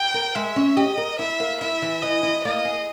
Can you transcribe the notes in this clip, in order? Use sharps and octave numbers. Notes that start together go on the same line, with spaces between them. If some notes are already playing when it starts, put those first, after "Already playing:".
Already playing: G5
A#4
G#3 E5
C#4
G4 D#5
A#4
E4 E5
A#3
E4 E5
E3
E3 D#5
E4
A#3 D#5
G#4